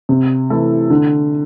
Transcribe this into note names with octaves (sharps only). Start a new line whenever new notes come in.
C3
E3 A3 E4 A4
D3